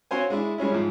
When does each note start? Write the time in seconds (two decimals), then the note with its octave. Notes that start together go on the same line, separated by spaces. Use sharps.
0.11 C4 F#4 C5 C#5 F5 G#5
0.30 G#3 D4 E4
0.58 G3 G#3 C#4 E4
0.72 G#2 F3